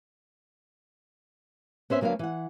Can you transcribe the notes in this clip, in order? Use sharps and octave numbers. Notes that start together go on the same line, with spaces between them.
B3 C#4 C5 E5
D2 F#3 A#3 D4 B4 F5
E3 F#5